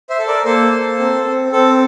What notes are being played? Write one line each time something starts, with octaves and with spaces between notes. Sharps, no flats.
C5 E5
A4
A#4 D5
A#3 A4 C5
A4
C4
C4
C4 A4